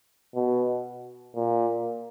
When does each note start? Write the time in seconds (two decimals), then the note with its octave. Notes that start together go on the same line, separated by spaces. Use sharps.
0.35 B2
1.36 A#2